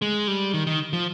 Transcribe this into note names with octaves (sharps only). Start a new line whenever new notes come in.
G#3
G3
D#3
D#3
F3